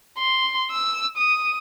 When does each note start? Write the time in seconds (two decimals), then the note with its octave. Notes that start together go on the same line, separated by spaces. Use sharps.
0.19 C6
0.71 E6
1.17 D#6